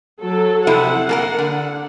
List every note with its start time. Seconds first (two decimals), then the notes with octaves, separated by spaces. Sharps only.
0.19 F#3 A4
0.67 F2 C3 E4 F#5
1.09 A#3 A4 A#4
1.39 D3